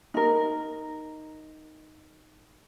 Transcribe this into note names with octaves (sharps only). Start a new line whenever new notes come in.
D#4 A#4